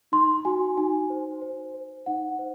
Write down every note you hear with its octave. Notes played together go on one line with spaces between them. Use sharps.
D#4 C6
F#4 G#5
D#4 G#5
C5
C5
C5
D#4 F#5
C5